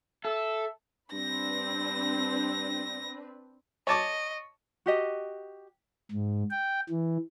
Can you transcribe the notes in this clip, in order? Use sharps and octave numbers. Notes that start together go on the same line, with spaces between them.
A4 E5
G2 C4 D4 B4 A#6
C#5 D#5 A5 D6
F#4 G4 D#5
G#2
G5
E3